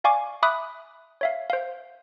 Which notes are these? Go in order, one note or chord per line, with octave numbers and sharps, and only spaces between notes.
D5 F5 G#5 C#6 D6
E5 B5 D6 D#6 F#6
C#5 E5 F5
C5 F5